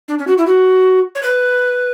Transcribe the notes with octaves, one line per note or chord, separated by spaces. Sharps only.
D4
C#4
F#4
E4
F#4
C#5
B4